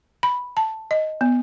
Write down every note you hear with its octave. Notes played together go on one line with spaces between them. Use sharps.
B5
A5
D#5
B3